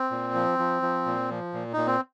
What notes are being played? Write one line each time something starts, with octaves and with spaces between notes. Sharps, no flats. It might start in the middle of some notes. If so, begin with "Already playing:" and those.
Already playing: C4
A#2
F3
F3
F3
A#2
F3
A#2
A#2 D#4
C4